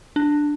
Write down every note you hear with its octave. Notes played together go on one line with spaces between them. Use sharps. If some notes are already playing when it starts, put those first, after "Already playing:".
D4